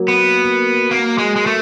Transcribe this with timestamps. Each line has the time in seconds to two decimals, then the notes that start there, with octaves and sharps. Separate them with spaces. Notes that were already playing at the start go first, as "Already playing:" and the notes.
Already playing: F#3 A#3
0.08 B3
0.91 A#3
1.18 G#3
1.36 G#3
1.46 A3